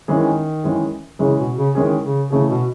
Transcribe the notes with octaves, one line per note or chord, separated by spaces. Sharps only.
D#3 E3 G#3 C#4 G#4
E3 G#3 C#4 G#4
C#3 E3 G#3 C#4 G#4
B2
C#3
D#3 E3 G#3 C#4 G#4
C#3
C#3 E3 A3 C#4 G#4
B2